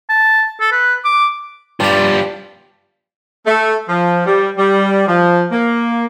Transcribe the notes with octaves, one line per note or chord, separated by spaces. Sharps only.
A5
A4
B4
D6
G2 G3 D4 F4 D5
A3
F3
G3
G3
F3
A#3